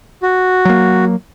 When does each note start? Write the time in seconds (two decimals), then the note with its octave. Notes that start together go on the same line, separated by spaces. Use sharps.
0.23 F#4
0.65 F#3 A#3